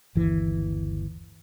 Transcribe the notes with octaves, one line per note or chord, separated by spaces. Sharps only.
G1 D#2 E3